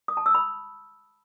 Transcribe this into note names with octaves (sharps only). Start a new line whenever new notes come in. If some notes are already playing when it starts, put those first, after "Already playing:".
D#6
A5
E6
B5